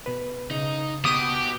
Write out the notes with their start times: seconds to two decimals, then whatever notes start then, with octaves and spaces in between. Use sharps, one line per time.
0.06 B2 B4
0.51 C#3 D#4
1.05 B2 G4 D#6